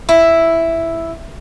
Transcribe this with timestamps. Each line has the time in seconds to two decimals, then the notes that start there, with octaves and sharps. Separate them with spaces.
0.09 E4